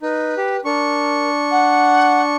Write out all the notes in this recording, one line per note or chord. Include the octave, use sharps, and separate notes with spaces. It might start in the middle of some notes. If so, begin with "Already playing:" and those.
D#4 B4
G4
D4 A#4 C#6
F#5